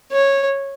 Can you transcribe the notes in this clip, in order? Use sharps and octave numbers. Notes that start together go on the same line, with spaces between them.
C#5